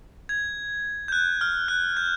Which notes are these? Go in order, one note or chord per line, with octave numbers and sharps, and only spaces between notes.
G#6
G6
F#6
F6
F#6
G6